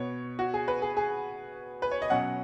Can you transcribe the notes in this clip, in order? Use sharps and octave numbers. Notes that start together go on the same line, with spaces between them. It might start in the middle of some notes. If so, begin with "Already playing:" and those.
Already playing: B2 B3 C#5
F#4
G#4
B4
G#4
G#4
B4
C#5
D#5
B2 F#3 C#4 F#5